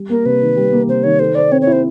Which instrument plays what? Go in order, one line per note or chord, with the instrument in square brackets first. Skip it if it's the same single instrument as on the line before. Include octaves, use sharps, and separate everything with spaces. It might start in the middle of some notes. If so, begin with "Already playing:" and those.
Already playing: [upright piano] G3
[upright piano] A#3 [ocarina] A#4
[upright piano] C3 [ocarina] B4
[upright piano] D#3
G3
A#3
[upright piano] C3 [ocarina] C5
[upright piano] D#3 [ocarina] C#5
[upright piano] A4 [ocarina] C5
[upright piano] C5 [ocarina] D5
[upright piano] C4 [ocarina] C#5
[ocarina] C#5
[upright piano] E4
[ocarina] C5